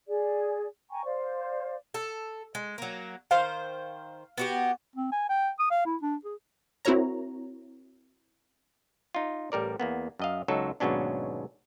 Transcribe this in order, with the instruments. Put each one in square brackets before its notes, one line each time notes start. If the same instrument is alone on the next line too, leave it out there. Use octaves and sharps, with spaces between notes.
[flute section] G#4 D5
G5 G#5 A#5 C#6
C5 D5 F5
[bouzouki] A4
G#3
F#3 A#3
[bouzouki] D#3 C5 [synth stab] F5
[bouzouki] B3 F#4 G4
[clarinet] C4
G#5
G5
D#6
F5
E4
D4
G#4
[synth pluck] C4 E4 F#4 A#4 C#5 A#5
[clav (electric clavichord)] D#4 F4
A1 G3 A#4 D5
E2 A#3 B3
F#2 D#5 F5
C#2 F#3 D#4 A4
D#2 G#2 B2 F#3 C#4 D4